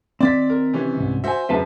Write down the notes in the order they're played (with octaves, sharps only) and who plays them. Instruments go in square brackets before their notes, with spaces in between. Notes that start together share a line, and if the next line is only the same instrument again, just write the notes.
[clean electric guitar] D#3 C4 [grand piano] D5 A6 B6
[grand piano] A#4
C3 E3 C#4
[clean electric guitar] C2 G#2
[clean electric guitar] F#4 G#5 [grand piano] C5 E5
[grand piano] F#2 C#3 [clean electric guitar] B4 E5 A5